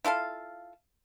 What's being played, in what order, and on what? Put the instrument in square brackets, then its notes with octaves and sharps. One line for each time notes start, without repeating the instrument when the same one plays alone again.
[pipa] E4 F4 A4 F5